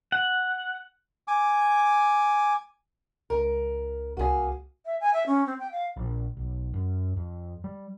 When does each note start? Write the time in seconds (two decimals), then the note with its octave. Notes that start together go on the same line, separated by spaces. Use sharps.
0.12 F#5
1.28 G#5 D6
3.30 C#2 A#4
4.17 C2 A#3 F#4 G#4 G#5
4.85 E5
5.01 G#5
5.13 E5
5.26 C#4
5.46 C4
5.59 G5
5.72 F5
5.97 A#1
6.37 B1
6.74 F#2
7.17 F2
7.64 G3